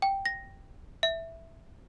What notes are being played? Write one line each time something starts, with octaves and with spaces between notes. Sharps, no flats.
G5
A#6
E5